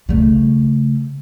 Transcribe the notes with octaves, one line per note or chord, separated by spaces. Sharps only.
C#3 A3